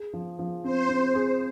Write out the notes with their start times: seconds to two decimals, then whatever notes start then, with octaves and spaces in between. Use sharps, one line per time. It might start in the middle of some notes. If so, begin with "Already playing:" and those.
Already playing: G#4
0.13 F3
0.39 F3
0.64 C4 C5
0.89 C4
1.15 G#4